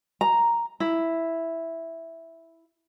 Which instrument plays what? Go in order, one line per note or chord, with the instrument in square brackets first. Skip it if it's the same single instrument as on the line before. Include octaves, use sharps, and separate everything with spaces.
[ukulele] A#5
E4